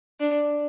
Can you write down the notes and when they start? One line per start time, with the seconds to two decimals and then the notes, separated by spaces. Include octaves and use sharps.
0.20 D4